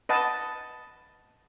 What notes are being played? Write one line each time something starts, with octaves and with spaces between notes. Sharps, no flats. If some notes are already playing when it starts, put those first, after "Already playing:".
B4 D#5 F#5 A5